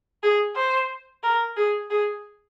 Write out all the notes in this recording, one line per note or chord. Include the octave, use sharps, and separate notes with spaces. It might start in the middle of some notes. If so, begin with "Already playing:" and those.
G#4
C5
A#4
G#4
G#4